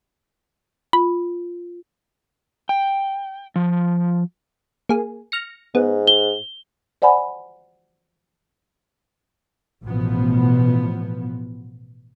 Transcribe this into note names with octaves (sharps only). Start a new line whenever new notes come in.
F4 B5
G5
F3
A#3 G#4
F6 A#6 C#7
G#2 B3
G7
C5 D5 F#5 G#5 B5
A1 B2 F3 B3